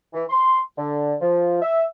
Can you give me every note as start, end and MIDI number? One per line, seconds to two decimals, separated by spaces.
0.13 0.23 52
0.30 0.59 84
0.77 1.14 50
1.21 1.57 53
1.61 1.83 76